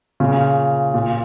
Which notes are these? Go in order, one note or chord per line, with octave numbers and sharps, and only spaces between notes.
A#2 C#3
A#2